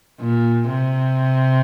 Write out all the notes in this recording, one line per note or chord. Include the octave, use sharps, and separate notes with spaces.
A#2
C3